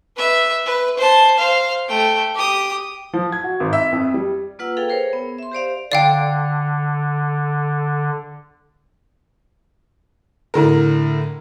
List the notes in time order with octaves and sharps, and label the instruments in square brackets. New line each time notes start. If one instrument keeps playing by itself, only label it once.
[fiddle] B4 E5
B4
C5 A5
C5 F5
A3 G5
G4 D#6
[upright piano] F3
G#6
F#4
G#1
E5
F2
G3
[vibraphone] A#3 F4 B4 F#5 E6
G#4 A4 B4 F5 G5
G#4 A#4 C5 C#5
B3
E5 C6
G4 C5 D5 F5
[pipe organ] D3 [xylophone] D5 F5 G5
[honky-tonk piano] A2 D3 A#4